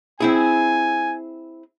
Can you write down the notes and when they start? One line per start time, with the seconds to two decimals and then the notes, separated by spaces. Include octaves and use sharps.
0.20 C4 E4 G#4 G#5